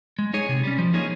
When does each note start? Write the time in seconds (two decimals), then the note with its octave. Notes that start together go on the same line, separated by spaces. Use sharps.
0.19 G#3
0.33 D#4 G#4 C#5
0.49 C3
0.63 G3 C#4
0.78 F3
0.93 A#3 D#4 G#4 C#5